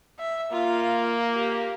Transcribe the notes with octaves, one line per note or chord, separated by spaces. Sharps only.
E5
A#3 F4
G4